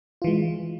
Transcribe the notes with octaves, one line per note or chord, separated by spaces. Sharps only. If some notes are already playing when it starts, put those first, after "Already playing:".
E3 G#3 F4